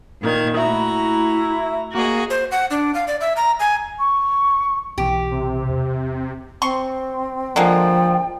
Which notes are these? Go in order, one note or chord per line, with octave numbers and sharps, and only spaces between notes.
A#2 D#3 G#6
A3 E4 F#4 A#5
A#3 F#4 G#4 D#5
C5
F#5
D4
F5
D5
E5
A#5
G#5
C#6
B1 B2 E3 G4
C3
E2
C4 C6 C#6
D3 F3 G#3 A#3 G5